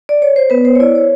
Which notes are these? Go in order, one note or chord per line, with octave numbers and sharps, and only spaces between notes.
D5
C#5
C5
B3 B4
C5
C#5
E4 D5
C#5